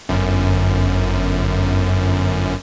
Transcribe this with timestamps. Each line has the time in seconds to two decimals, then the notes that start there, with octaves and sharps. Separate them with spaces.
0.09 G1 F#2